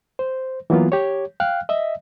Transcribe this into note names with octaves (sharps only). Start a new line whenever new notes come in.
C5
E3 F#3 A#3 B3 F4
G4 C#5
F5 G5 F6 F#6
D#5 E5